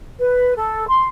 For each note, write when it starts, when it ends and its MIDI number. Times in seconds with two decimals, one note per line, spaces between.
0.19 0.53 71
0.56 0.86 69
0.87 1.06 84